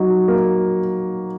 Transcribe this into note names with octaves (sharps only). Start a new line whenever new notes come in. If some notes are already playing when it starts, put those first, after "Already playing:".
Already playing: F#3 D#4
A#3